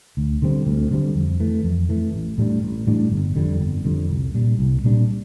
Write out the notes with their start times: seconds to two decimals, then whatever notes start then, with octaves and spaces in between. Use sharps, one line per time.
0.17 D2
0.42 D3 G3 C4
0.67 D2
0.91 D3 G3 C4
1.16 F2
1.40 E3 A3
1.64 F2
1.89 E3 A3
2.14 A1
2.38 A2 G3 D4
2.63 A1
2.87 A2 G3 D4
3.12 G1
3.36 F2 D3 G3
3.61 G1
3.85 F2 D3 G3
4.10 C2
4.34 A#2 G3 D4
4.59 C2
4.83 A#2 G3 D4